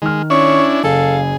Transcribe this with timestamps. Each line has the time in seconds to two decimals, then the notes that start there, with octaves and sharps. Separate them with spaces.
0.02 D#3 G#3 F6
0.30 C#4 D4 E4 C#5
0.84 F#1 G#4 A4 F5